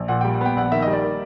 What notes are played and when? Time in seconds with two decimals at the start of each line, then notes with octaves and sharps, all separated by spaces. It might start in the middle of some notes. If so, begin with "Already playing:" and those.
Already playing: A#1
0.08 A#2 F#5
0.21 G3 G5
0.33 F#5
0.41 B3 G5
0.56 A#1 F#5
0.72 D#3 E5
0.82 D#5
0.87 G3
0.93 D5
1.04 A#3